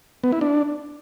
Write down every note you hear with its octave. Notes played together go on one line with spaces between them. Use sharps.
B3
E4
D4